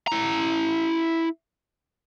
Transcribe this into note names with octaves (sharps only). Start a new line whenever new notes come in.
E4 A#5